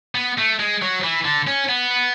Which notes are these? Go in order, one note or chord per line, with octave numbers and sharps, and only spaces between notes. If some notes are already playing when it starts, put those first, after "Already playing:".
B3
A3
G#3
F#3
E3
D3
C#4
B3